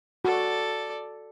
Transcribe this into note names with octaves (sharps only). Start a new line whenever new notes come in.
F#4 A4 D5